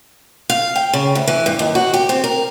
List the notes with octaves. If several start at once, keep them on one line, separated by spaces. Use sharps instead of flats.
F5
G5
C#3
D2
E3
G2
D#2
F#4
G4
C4
A#4